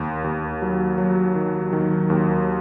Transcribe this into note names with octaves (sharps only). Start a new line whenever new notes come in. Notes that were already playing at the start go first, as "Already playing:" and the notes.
Already playing: D#2
D#2
F#3
F#3
D#3
D#3
D#2